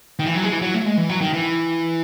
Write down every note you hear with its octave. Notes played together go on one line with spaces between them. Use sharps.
D#3
E3
F#3
G#3
E3
F#3
A3
G#3
E3
F#3
D#3
E3